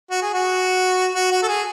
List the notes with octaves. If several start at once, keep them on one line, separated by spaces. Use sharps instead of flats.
F#4
G#4
F#4
F#4
F#4
A4
G#4